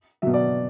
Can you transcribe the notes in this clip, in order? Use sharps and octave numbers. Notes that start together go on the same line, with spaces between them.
B2 F#3 E5
D5